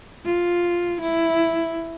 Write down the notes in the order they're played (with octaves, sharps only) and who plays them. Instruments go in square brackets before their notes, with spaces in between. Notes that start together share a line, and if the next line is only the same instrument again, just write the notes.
[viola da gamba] F4
E4